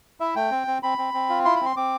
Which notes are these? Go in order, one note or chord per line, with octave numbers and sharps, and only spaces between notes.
E4 E5
A3 G5
C4
C4
C4 B5
C4
C4
F4
E4 C6
C4 B5
C6
C4 D6